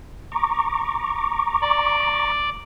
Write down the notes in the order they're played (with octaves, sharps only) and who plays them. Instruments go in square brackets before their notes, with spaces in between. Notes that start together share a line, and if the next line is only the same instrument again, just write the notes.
[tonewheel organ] A#5 C#6 D6
[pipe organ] D5